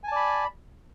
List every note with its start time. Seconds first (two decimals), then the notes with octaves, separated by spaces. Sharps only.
0.04 G#5
0.08 A5
0.12 D5
0.16 B5